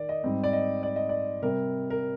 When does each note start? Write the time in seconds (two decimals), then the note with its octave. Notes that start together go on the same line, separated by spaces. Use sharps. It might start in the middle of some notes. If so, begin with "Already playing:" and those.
Already playing: D#3 D5
0.09 D#5
0.24 G#2 G3 C4
0.44 D5
0.53 D#5
0.83 D5
0.96 D#5
1.09 D5
1.42 C3 G3 C4 A#4
1.90 A#4